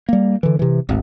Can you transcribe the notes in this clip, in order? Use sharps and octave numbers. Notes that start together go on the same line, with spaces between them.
G3 A#3
D3 E3
C3 E3
D1 G#1